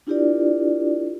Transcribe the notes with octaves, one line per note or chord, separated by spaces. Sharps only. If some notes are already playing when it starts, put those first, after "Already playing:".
D4 E4 F4 G4 A#4 D5